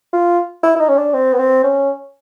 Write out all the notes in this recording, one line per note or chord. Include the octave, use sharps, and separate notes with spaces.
F4
E4
E4
D#4
C#4
D4
C4
B3
C4
C#4